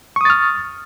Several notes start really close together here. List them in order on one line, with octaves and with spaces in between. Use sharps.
C#6 D#6 A6 F6